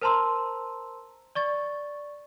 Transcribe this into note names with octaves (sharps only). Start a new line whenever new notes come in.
A#4 C5 A5 A#5 C6 E6
D5 C#6 A6